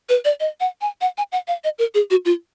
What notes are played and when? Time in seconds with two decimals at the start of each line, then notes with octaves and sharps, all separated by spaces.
0.09 B4
0.25 D5
0.40 D#5
0.60 F#5
0.81 G#5
1.01 F#5
1.18 G#5
1.32 F#5
1.48 F5
1.64 D#5
1.79 A#4
1.94 G#4
2.11 F#4
2.25 F4